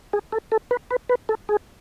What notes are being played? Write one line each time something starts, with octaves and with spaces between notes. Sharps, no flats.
G#4
A4
A4
B4
B4
B4
A4
G#4